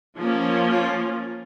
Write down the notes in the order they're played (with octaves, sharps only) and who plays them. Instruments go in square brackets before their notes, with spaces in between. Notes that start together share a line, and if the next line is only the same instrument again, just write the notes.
[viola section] F3 A#3 C#4
F4